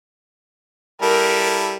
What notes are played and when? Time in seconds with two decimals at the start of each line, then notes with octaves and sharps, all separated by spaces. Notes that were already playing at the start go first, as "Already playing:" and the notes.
1.02 G3 E4 A4 A#4